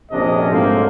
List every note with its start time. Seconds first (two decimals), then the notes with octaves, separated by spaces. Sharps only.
0.11 A#1 F2 C3 C#4 D4 D#5
0.50 G#2 F#3 A3 A#3 C4